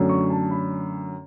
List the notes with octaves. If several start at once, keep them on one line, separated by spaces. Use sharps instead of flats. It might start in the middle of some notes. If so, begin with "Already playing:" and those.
Already playing: F#2 D3 A3 C#4
C#6
A5
B5